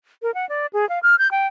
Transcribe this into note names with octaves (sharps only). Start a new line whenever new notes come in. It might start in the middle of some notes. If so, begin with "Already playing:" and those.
A#4
F#5
D5
G#4
F5
F6
G6
G5